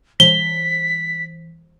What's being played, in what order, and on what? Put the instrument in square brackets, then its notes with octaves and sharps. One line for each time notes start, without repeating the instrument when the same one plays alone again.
[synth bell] E3 [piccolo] B6 [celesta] G7